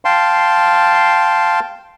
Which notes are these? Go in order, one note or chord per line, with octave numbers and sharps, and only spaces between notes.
F5 G5 A5 C6